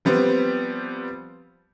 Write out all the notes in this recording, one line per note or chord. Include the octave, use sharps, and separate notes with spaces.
F3 G3 B3 C4